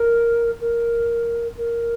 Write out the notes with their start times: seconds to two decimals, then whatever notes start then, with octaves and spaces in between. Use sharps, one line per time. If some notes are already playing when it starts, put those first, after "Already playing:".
Already playing: A#4
0.61 A#4
1.57 A#4